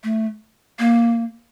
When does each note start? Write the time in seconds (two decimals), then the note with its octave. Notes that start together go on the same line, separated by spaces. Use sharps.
0.04 A3
0.79 A#3